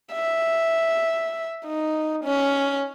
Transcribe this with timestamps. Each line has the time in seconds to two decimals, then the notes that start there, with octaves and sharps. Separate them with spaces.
0.13 E5
1.67 D#4
2.24 C#4